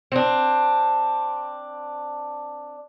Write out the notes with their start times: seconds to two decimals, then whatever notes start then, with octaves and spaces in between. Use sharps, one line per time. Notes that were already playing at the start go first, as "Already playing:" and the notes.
0.12 C4 D4